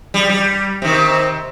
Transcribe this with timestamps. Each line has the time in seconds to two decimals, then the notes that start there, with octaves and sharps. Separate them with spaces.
0.14 G3
0.29 G3
0.82 C3 D#3